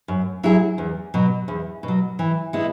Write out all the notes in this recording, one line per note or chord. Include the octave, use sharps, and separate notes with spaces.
F#2
F#3 E4 G#4
E2
B2 F#3
E2
B2
F#3
E3
G#3 B3 E4